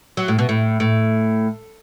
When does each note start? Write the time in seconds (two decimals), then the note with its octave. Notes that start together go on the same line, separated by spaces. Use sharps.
0.17 F#3
0.28 A2
0.39 B2
0.49 A2
0.80 A2